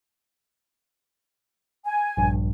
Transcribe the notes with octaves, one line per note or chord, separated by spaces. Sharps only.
G#5
A#1 G2